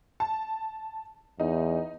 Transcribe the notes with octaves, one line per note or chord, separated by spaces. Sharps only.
A5
E2 D#4